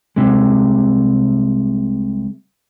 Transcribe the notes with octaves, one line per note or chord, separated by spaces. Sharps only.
C2 C3 G#3